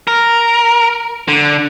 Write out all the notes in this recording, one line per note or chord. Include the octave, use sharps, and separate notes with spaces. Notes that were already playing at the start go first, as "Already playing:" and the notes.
A#4
D3